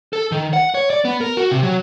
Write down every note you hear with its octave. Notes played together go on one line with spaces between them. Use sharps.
A4
D#3
F#5
C#5
D5
B3
A#4
F#4
C3
F#3